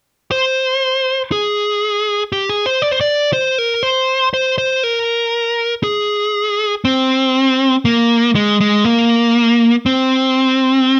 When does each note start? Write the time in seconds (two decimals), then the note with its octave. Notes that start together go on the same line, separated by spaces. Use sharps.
0.31 C5
1.32 G#4
2.32 G4
2.49 G#4
2.66 C5
2.82 D5
2.91 C5
3.01 D5
3.33 C5
3.58 A#4
3.83 C5
4.34 C5
4.58 C5
4.84 A#4
5.83 G#4
6.85 C4
7.85 A#3
8.35 G#3
8.61 G#3
8.85 A#3
9.86 C4